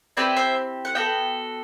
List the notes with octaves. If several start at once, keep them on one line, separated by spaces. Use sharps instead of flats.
C4 E4 G4 B4 D5
C5 E5
F#5
B3 F#4 A4 E5 G5